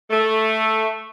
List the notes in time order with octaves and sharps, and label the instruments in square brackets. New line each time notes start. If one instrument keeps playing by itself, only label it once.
[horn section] A3